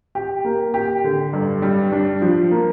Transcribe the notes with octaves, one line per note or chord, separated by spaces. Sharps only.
G4
A#3
G4
D3
G2
G3
D4
F3
A#3